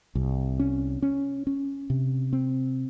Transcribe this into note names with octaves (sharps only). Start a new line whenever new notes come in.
C2
C#4
C#4
C#4
C3
C4